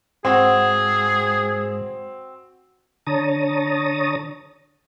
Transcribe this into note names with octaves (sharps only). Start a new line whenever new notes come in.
G#2 C4 F#4 G#4
D3 C#5 A5 A#5 D#6